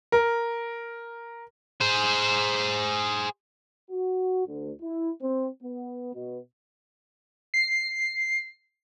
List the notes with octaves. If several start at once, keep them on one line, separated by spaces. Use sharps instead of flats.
A#4
G#4 C5
F#4
D2
E4
C4
B3
B2
C7